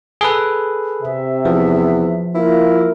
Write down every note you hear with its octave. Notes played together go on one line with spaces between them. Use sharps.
G#4 A4 B4
C3 E5
E2 F3
A#3 E4 F4 A#4